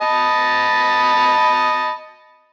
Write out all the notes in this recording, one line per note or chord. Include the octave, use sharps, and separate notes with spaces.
D#5 A5 B5